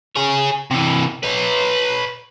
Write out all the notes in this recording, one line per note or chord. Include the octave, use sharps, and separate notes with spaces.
G#4 C#5
C3 E3
B4 C#5